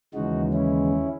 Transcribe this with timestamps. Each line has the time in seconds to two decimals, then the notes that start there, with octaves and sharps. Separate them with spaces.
0.14 D#2 C#3 E3 G#3 D#4 F#4
0.53 C#4 E4